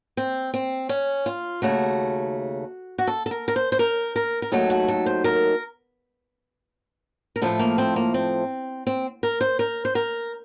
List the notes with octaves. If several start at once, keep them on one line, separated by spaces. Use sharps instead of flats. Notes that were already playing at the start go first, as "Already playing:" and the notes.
C4
C4
C#4
F4
D#2 C#3 A3 F#4
F#4
A4
A4
A#4
A#4
C5
C5
A#4
A#4
A#4
D#2 D#3 F#3 A3 A4
F#4
A4
C5
A#4
A#4
A2 F3 A3 A4
A#3
C4
A#3
C4
C4
A#4
C5
A#4
C5
A#4